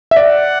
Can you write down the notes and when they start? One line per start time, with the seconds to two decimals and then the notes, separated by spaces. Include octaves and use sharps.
0.11 E5
0.16 D5 F#5